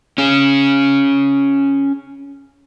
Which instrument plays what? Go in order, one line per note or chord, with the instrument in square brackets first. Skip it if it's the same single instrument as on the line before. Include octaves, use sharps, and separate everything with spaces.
[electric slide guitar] C#4 G#4